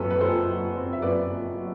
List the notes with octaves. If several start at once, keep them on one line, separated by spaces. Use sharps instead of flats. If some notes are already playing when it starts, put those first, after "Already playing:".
Already playing: F#2 C4 A4 B4
B4
F#1 A4 C5
F#3
C4
E5
F#2 B4 D5
F#1
F#3